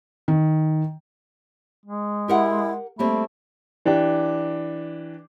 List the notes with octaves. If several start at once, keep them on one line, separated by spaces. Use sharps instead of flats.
D#3
G#3
E4 G4 A#4 F#5
G3 A3 A#3 C4 B5
E3 D4 G4